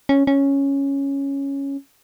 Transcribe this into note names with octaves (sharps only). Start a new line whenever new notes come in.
C#4
C#4